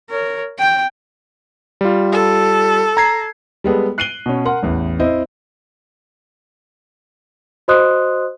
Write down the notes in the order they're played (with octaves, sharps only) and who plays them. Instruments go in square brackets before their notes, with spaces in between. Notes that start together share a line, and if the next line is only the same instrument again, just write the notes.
[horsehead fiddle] A#4 C#5
G5
[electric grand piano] G3 F4
[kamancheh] A4
[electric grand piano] A#5 G#6 C7
[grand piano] G3 G#3 B3 A4
F#6 C7 D7 D#7 F#7 G7
B2 C#4
A#4 F#5 C6
A1 E2
C4 E4 C5 D#5
[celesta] F#4 C5 D#5 C6 D#6 F#6